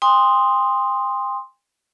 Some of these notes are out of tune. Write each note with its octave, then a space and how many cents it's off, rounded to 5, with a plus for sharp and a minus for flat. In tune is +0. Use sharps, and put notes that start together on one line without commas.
G5 +45 C6 +0 D#6 -5